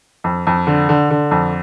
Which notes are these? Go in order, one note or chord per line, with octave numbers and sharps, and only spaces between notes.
F2
F2
D3
D3
D3
F2